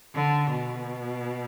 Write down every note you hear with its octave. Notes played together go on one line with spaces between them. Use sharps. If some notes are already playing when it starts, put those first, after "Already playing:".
D3
B2